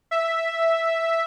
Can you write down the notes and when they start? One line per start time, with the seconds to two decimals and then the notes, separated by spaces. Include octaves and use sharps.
0.11 E5